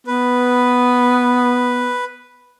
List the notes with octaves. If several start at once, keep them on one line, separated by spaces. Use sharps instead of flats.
B3 B4